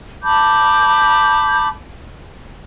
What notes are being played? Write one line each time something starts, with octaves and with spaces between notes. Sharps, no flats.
A5 B5 D6 G6